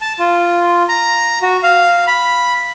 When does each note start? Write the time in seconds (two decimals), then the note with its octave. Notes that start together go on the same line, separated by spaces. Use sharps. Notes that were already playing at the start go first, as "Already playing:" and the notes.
0.01 A5
0.19 F4
0.89 A#5
1.42 F#4
1.63 F5
2.07 B5